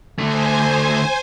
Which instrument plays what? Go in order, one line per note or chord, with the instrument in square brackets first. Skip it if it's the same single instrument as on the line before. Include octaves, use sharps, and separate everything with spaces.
[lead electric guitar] D3 A3 [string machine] C5 G#5